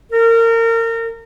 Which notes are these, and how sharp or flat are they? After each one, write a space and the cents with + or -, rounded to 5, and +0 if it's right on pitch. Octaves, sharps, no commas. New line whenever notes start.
A#4 -30